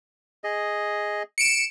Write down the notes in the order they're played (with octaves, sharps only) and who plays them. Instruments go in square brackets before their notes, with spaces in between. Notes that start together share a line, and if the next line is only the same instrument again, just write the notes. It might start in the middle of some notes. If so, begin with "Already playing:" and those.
[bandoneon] G#4 D#5
[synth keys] C#7 D7 E7